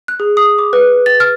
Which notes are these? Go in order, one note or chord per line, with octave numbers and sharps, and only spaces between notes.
F#6
G#4
D#6
D6
B4
A6
F6